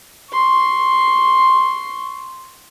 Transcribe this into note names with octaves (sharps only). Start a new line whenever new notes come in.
C6 C#6